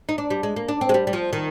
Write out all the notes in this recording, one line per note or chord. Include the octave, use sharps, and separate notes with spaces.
D#4
D4
G3
G#3
A#3
D4
C4
G#3
G3
G3
F3
D#3